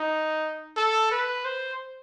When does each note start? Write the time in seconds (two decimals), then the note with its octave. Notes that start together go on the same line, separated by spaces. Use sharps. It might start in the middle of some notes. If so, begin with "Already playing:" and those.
Already playing: D#4
0.76 A4
1.11 B4
1.45 C5